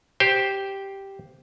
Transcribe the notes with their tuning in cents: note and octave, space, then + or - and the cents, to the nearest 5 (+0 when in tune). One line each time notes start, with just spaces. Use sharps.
G4 -5 C5 +0